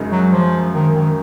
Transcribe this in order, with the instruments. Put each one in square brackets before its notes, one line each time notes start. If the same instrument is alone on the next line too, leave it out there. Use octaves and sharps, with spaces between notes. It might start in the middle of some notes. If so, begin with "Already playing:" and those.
Already playing: [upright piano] F#2 C#3 G#3 D#4 A#4
[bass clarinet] F#3
F3
D#3
D#3